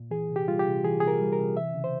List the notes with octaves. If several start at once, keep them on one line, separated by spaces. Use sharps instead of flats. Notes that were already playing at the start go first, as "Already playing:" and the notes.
Already playing: A#2
E3 G#4
C3
G4
G3 F4
G4
C3
E3 G#4
C3 G#4
A#4
G3
A#4
C3
E3 E5
C#3
C5